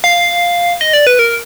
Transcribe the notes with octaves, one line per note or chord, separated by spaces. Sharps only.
F5
D#5
D5
B4
A#4